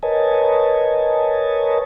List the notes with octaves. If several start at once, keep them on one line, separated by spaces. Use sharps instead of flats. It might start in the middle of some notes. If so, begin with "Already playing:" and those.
A#4 B4 C#5 D#5 G#5 A5